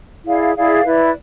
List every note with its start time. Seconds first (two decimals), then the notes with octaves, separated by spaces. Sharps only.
0.25 E4 G#4 D5 F5
0.55 E4 G#4 D5 F5
0.85 E4 B4 D5